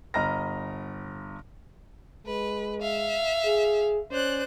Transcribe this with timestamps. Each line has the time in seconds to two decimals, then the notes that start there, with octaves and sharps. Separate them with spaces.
0.14 G1 D#5 A#5 B5 F6 A#6
2.27 G#3 B4
2.81 E5 F5
3.46 G#4
4.11 C#4 C5 D5 F#6